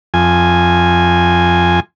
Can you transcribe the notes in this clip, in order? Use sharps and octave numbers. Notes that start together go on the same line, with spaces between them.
F2 G#5